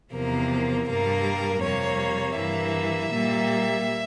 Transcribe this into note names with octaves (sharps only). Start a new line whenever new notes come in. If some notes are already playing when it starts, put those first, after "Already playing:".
E2 C3 F3 A#3 A#4
G2 G3 A#3 A#4
F2 C3 G3 A#3 C#5
G2 E3 A#3 E5
A#2 G3 A#3